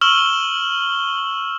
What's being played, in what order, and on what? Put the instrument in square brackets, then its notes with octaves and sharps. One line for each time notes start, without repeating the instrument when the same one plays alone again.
[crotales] C#6 E6 F6 E7 F#7 G7